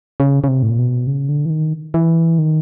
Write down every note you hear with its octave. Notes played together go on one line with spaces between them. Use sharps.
C#3
C#3
C3
A2
A#2
B2
C#3
D3
E3
D#3
E3
D#3